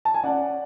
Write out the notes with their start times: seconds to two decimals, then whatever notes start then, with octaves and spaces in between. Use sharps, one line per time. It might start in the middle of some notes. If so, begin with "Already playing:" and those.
0.05 A5
0.14 G#5
0.24 C#4 D5 F#5